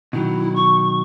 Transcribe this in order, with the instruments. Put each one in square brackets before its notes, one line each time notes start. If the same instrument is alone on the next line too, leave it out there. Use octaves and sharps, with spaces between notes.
[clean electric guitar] B2 D#3 F#3 [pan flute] E4
[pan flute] C#6